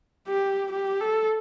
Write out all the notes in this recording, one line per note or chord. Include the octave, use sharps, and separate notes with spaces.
G4
G4
A4